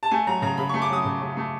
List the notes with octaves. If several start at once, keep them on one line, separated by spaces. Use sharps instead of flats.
A5
A3 G#5
F#3 A#5
C#3 A#5
C#3 B5
A3 C#6
D6
F#3 D#6
C#3
C#3
A3